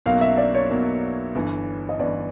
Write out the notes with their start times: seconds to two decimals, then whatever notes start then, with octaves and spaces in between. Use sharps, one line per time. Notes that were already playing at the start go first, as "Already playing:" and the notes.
0.06 B1 B2 F#3 A#3 F5
0.21 E5
0.37 D5
0.55 C#5
0.70 B1 B2 F#3 A#3
1.35 G1 G2 E3
1.89 D#5
1.99 G1 G2 E3 D5